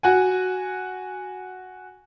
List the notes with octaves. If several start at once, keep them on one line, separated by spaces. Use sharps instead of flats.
F#4 F#5 G#5